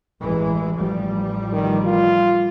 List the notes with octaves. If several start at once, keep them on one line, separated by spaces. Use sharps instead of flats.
A1 E3 G#3
A1 F3 G3
D#3
F4